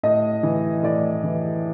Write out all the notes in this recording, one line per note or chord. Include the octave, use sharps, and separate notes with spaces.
A2 D#5
E3
A2 D5
E3